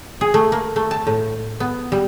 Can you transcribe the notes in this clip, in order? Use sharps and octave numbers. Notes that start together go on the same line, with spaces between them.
G#4
A3
A#3
A3
A5
A2
B3
G3